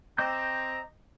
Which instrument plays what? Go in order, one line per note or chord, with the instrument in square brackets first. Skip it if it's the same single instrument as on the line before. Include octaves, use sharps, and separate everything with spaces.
[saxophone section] C4 [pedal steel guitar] D#5 D6 G6 [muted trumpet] A#5